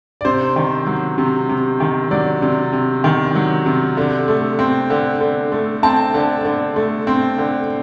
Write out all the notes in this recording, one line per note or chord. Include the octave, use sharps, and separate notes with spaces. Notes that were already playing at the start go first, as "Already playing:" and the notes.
D5
C3 C5
D#3
F#3
C3
C3
D#3
F#3 D5
C3
C3
D#3
F#3
C3
D3
A3
C4
D3
D3
A3
C4 A5
D3
D3
A3
C4
D3